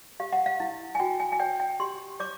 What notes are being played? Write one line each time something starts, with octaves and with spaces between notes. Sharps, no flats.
G4 F5
F#5
F5
E4
G#5
F#4 G5
G#5
G#5
C#5 G5
G5
G4 C6
C#5 D6